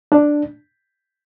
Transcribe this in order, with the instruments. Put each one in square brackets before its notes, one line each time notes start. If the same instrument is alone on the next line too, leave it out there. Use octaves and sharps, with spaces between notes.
[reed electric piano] D4